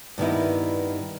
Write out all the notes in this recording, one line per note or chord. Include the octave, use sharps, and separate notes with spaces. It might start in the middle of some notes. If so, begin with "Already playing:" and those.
G2 D#3 B3 E4